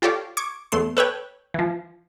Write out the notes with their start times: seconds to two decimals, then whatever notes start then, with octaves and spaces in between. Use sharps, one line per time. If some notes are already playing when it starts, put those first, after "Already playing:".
0.02 F4 G4 A4 C#5 D5 F5
0.37 C#6 D6 G#6
0.72 E2 A3 C6
0.97 A4 B4 C#5 G5
1.54 E3 F3